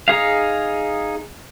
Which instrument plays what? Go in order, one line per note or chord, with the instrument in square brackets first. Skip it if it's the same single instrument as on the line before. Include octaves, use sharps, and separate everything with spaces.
[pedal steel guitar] D#4 G#4 F5